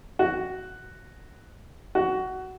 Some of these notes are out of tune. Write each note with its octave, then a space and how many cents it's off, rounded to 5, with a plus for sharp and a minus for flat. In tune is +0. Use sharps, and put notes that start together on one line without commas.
F#4 +5
F#4 +15